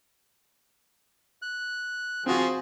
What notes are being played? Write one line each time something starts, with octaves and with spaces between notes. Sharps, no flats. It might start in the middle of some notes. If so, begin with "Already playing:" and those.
F#6
F3 C4 F#4 G#4